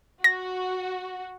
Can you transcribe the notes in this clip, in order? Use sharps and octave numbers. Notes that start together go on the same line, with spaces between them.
F#4 A#6